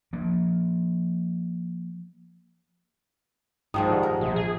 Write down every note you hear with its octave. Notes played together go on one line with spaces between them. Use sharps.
F3 A#3
G#2 D#3 F3 G#3 D#6
G4 D5 F#5
A#4
A#1 A#2
G#4